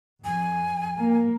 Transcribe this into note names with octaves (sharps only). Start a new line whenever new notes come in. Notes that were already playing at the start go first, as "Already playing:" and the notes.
F2 G#5
A#3